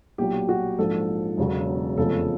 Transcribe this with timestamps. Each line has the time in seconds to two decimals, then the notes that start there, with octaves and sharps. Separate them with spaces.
0.18 B1 A#2 F#3 G4
0.49 F#4
0.79 A#1 G#2 F3 A4
1.38 E1 E2 C#3 F#3
1.97 F1 E2 C#3 F3 G#3 A4